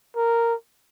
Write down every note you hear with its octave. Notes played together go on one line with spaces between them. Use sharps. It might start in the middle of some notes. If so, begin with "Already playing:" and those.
A#4